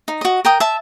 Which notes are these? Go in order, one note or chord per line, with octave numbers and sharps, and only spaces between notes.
D#4
F#4 D#5
A#4 G5 D#6
E5 A5